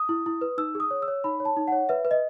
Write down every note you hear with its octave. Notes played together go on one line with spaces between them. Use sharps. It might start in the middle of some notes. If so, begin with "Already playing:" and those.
Already playing: D#6
E4
E4
B4
D#4 E6
G#4
D#6
C#5
E6
C#5
D#4 B5
C#5
A5
D#4
C#5 F#5
B4 E5
B4
D#5